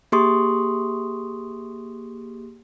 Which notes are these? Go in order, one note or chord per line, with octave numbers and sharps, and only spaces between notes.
A#3 G4 G#4 C6 C#6 D#6